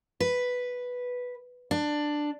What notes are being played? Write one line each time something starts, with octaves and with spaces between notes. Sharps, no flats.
B4
D4